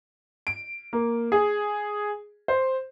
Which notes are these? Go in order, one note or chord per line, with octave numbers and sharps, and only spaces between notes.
D7
A#3
G#4
C5